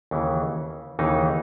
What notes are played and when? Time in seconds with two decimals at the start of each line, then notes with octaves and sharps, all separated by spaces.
0.11 D#2 C#3 E3
0.99 D#2 C#3 E3 D#4